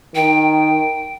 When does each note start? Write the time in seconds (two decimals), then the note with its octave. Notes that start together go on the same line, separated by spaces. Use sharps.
0.15 D#3 G5